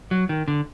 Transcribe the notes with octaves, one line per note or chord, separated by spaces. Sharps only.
F#3
D#3
D3